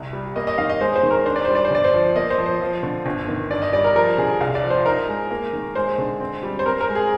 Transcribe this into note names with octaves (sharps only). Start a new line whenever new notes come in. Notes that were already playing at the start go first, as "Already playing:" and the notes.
Already playing: C2
G3
A#3 D#5
D#5
D#3 F5
D#5
G#3 C5
C5
D#3
A#4
D4 C5
D5
G3 C5
D5
C5
G1 D5
C5
F3
A#3 D#5
C5
F3
C5
F3
D3
G1
D#3
G2 D5
D#5
G3 D5
A#4
F3 A#4
D3 G#4
C2 F5
D5
F3
C5
D#4 A#4
G#3
A#3
D#3
G#3 C5
D3
C4
G3
C5
C4 A#4
A#4
G#3
G#4